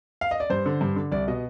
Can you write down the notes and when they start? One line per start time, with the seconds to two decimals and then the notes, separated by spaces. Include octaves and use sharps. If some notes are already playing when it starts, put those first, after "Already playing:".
0.21 F5
0.31 D#5
0.40 D5
0.50 G2 C5
0.66 D3
0.81 G2
0.96 D3
1.12 C2 D5
1.28 B2 D#5